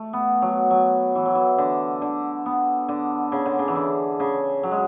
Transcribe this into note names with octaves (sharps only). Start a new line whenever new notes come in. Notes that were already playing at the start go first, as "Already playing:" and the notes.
Already playing: A3
B3
F#3
F#3
E3
F#3
E3
D3
D3
B3
D3
C#3
D3
C#3
E3
D3
C#3
F#3
G#3